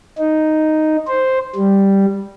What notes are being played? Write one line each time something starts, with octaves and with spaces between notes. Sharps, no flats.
D#4
C5
G3